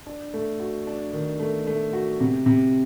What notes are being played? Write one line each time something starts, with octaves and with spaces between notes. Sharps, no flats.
D4
A3
F#4
D4
D#3
A3
A3
F#4
C3
C3